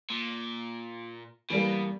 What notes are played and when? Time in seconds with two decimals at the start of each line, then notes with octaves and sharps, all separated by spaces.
0.10 A#2
1.50 B2 E3 G3 A#3